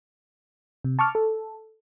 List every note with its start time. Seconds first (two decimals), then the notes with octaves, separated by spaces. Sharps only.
0.84 C3
0.99 A5 C#6 D6 F6
1.15 A4